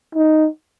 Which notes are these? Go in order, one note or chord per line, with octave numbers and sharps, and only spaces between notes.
D#4